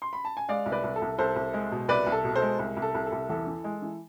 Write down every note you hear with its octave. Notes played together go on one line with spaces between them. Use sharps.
C6
B5
A5
G#5
G#3 D5 F5
C2
B4 D5
C2
A4
C2
C2 A4 C5
C2
G#3
B2
C2 B4 D5
C2
A4
B2
A4 C5
G#3
C2
C2
A4
C2
A4
C2
E2 A4
E3
G#3
E3